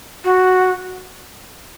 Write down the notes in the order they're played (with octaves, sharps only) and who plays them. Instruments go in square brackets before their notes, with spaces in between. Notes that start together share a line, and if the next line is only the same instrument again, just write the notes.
[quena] F#4